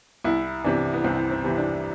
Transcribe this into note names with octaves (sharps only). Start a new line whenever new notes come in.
C2 E4
C3 E3 D4
B3
C2 C4
C4
C3 E3
D4